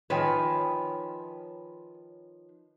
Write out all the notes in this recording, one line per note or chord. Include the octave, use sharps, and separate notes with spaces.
D#3 F3 B4 C#5 G5 G#5